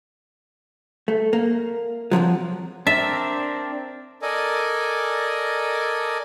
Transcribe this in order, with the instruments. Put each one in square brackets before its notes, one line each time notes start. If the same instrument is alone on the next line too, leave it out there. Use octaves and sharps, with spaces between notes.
[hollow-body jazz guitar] A3
A#3
F2 A2 F3 F#3
[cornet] C4 [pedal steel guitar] D4 A#4 [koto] E5
[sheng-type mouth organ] A4 A#4 D5 D#5 G#5